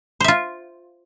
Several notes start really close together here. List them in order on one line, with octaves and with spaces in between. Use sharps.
C5 E5 F4